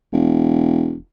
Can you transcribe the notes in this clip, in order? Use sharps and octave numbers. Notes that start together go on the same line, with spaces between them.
E1